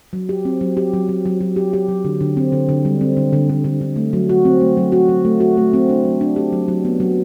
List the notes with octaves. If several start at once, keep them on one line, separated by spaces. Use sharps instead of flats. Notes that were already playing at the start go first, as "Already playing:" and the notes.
F#3
G4
C4
F#3
G4
F#3
F#3
F#3
F#3
G4
G4
F#3
D3
D3
C4
D3
D3
G3
C4
D3
D3
D3
D3
D3
A3
F#3
F#4
C4
A3
F#3
F#4
F#3
A3
F#4
A3
C4
D4
F#3
D4
G4
F#3
F#3
B3
F#3